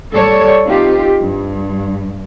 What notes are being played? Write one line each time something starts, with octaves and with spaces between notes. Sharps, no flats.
G3 A4 C#5 D5
C4 D#4 F4 G4
G2